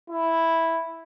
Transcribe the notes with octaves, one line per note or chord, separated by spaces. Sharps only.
E4